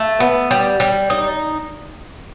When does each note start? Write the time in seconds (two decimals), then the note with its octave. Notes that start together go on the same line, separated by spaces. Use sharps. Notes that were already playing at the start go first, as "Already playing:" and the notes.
Already playing: A3
0.20 B3
0.51 G3
0.80 G3
1.10 D#4